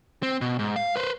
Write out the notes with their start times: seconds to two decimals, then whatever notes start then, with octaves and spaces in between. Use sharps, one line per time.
0.23 C4
0.41 B2
0.59 G#2
0.76 F5
0.96 B4 C5